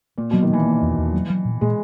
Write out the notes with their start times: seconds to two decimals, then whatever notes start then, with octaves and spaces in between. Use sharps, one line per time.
0.18 A#2 A#3
0.31 B2 F#3
0.43 D#3
0.50 E3 A#3
0.65 A#3
0.82 E2
0.98 E2
1.13 F#3
1.30 F#3
1.45 A#2
1.61 A#2 G#3